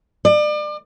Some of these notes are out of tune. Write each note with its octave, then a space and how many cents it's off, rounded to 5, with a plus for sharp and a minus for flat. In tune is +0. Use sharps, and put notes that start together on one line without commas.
D5 +35